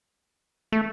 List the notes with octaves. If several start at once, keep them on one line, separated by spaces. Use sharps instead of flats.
A3